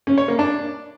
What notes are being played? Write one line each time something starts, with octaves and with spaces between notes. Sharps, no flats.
C#4
C#5
A#3
D4